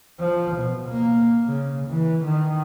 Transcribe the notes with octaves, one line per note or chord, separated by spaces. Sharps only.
F3
B2
A#3
C#3
E3
D#3